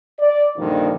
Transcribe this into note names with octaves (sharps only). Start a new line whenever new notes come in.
D5
A#1 G2 D3 D#3 F3